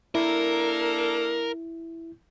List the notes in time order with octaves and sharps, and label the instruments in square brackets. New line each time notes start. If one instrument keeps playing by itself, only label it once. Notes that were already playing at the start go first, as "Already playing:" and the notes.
[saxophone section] A#3 D4 A4 [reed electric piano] E4 [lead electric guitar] A#4